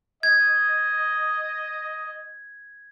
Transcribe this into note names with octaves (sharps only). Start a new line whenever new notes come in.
D#5 G#6